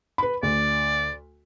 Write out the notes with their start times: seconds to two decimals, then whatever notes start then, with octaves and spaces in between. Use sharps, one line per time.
0.18 B4 B5
0.43 D2 D5